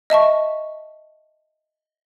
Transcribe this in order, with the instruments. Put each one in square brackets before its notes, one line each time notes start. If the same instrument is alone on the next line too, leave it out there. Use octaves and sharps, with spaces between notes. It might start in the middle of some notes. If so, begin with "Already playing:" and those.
[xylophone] D#5 E5 A5 C#6